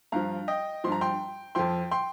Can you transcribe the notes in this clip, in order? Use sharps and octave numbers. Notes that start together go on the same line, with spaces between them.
G2 F3 F5 A#5
D#5 G5
G2 F3 C6
A#5
G5 C6
F2 F3 G5 C6
G5 C6